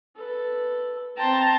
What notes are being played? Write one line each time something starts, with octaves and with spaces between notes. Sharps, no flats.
A4 B4
C4 G5 A5 A#5 C6